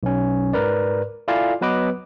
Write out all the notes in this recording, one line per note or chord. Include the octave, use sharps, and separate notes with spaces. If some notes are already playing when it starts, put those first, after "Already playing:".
B1 C#4
G#2 A#4 B4 D5
E4 F4 A4 D5 F5 G#5
F#3 B3 B4 D#5 D6